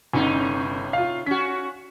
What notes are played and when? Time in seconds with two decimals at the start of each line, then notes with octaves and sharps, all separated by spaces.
0.13 G1 A2 C3 D#4
0.93 F4 F5
1.26 C#4 F#4 B6